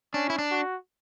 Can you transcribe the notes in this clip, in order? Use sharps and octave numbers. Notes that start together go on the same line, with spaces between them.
C#4 D4
E4
D4
F#4